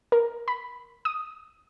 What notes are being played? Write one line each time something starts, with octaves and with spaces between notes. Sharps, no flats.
A#4
B5
D#6